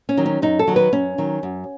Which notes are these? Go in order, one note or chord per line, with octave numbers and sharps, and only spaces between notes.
C#4
D#3 F#3
C#4
F#2 D#4
A4
D#3 F#3
B4
F#2 C#4
D#3 F#3
F#2